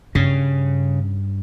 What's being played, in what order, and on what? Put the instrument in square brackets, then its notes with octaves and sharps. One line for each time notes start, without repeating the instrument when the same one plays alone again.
[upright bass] G2 [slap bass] C#3